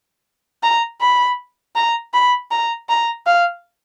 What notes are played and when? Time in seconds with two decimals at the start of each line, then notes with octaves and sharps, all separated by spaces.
0.63 A#5
1.01 B5
1.75 A#5
2.13 B5
2.51 A#5
2.89 A#5
3.26 F5